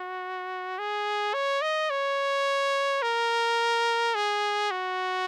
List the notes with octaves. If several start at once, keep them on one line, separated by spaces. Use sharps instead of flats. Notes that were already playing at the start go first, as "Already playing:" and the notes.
Already playing: F#4
G#4
C#5
D#5
C#5
A#4
G#4
F#4